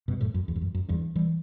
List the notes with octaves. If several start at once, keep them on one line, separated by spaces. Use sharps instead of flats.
G2 B2
F#2 A2
F#2
E2
G2
F#2
F#2
E2 G2
E3 G3